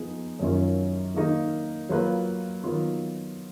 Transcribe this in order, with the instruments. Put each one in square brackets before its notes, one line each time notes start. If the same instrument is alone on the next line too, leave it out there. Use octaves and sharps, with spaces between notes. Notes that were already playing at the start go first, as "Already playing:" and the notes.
Already playing: [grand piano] F3 B3 D#4 G#4
F#2 D#3 F#3 C#4 F4
D#3 A#3 D#4
F#3 A#3 F4 B4
D#3 F#3 B3 F4